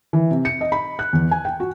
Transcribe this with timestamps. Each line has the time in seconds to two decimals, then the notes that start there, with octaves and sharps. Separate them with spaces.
0.13 E3
0.31 C3
0.45 C#7
0.61 D#5
0.72 B5
0.99 F#6
1.13 E2
1.31 G#5
1.45 G5
1.60 F#4